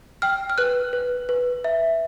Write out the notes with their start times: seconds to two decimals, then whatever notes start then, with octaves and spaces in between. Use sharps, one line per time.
0.22 G5 F6
0.50 F6
0.58 B4 F#6
0.93 B4
1.29 B4
1.64 E5